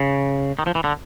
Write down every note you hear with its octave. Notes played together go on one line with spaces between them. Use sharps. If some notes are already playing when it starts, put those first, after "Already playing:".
Already playing: C#3
D#3
F3
E3
D3